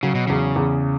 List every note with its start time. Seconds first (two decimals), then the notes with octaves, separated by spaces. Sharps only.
0.03 C#3 F#3
0.15 B2
0.27 E2 C#3
0.56 E2